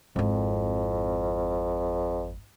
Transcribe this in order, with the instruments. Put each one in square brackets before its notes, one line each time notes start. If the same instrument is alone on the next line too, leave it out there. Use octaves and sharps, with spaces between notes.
[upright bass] G#1 E4 [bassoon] F2